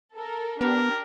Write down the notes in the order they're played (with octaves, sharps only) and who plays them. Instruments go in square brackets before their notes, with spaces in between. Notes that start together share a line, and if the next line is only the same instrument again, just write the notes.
[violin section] A4 A#4
[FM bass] B3 [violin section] D4 G4 [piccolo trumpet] A#4